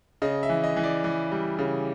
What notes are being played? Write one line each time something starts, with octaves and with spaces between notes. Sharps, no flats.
C#3 D#5
E5
E3
D#5
E3
D5
E3
G3
C#3